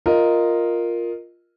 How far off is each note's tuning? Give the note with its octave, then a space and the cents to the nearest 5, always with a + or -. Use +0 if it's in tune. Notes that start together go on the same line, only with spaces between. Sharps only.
F4 +0 A#4 +0 D#5 +0